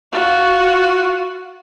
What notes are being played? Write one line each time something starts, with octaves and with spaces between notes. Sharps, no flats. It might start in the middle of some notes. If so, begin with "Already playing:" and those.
F4 F#4